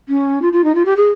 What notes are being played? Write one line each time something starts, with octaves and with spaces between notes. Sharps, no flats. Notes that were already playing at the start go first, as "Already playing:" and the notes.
C#4
F4
F4
D#4
F4
G4
G#4